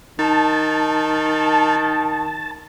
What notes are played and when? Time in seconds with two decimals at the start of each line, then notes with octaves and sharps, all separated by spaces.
0.19 D#3 D#4 A5